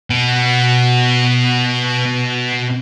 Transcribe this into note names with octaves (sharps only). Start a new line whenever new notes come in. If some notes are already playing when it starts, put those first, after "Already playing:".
B2 B3